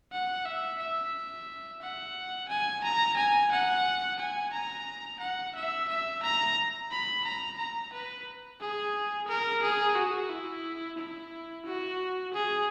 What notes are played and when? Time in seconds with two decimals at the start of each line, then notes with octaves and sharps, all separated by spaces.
0.12 F#5
0.46 E5
0.79 E5
1.82 F#5
2.49 G#5
2.84 A#5
3.17 G#5
3.52 F#5
4.19 G#5
4.53 A#5
5.20 F#5
5.55 E5
5.89 E5
6.23 A#5
6.91 B5
7.24 A#5
7.58 A#5
7.93 B4
8.60 G#4
9.28 A#4
9.63 G#4
9.96 F#4
10.30 E4
10.98 E4
11.66 F#4
12.34 G#4